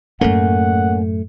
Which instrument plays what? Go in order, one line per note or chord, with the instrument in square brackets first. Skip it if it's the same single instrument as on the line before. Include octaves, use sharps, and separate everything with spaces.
[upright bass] F#2 A2 [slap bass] A3 [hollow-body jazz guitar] A#3 C#4 [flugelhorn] F#5